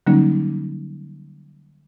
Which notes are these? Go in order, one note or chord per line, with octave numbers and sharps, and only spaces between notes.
D3 F#3 G3 A#3 C#4 D#4